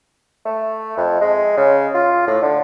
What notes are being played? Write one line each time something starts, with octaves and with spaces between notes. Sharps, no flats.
A3
F2
G#3
C#3
F4
A2
D3